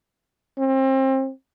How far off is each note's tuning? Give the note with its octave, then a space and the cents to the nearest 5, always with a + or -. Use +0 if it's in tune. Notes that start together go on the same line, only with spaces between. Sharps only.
C4 +30